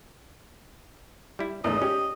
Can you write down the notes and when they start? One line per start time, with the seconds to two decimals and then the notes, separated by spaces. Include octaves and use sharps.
1.39 G3 E4
1.64 E2 G#2 C#3 A3 A#4 D#5
1.82 C#4 G4